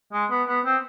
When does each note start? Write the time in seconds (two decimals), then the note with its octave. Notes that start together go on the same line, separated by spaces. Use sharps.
0.13 G#3
0.31 B3
0.48 B3
0.65 C4